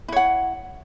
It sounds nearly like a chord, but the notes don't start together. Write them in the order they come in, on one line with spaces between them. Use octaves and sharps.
E4 C#5 F#5